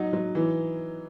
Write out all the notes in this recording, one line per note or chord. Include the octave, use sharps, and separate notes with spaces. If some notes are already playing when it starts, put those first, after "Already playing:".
Already playing: F#3 D#4
F#3
E3